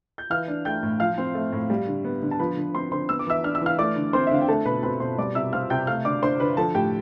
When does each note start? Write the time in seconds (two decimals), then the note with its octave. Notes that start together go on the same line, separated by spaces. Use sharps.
0.18 G6
0.30 E3 F5 F6
0.48 D4
0.65 A3 G5 G6
0.83 A2
1.00 F3 F5 F6
1.18 C4
1.35 A3
1.52 A2
1.70 G3
1.87 D3
2.05 B3
2.22 D3
2.31 A5
2.39 F3 B4 B5
2.57 D3
2.74 C4 C5 C6
2.91 D3 C5 C6
3.09 B3 E6
3.19 D6
3.27 E3 E5 E6
3.44 D4 F6
3.55 E6
3.61 E3 F5 F6
3.79 A3 D5 D6
3.96 D3
4.13 C4 C5 C6
4.27 E5
4.31 D3 F5
4.41 G5
4.48 A3 A4 A5
4.65 B2 B4 B5
4.83 C4 B4 B5
5.00 B2 C5 C6
5.18 G3 D5 D6
5.35 C3 E5 E6
5.52 C4 F5 F6
5.70 C3 G5 G6
5.87 A3 F5 F6
6.05 D3 D5 D6
6.22 D4 C5 C6
6.40 D3 B4 B5
6.57 F3 A4 A5
6.75 A2 G4 G5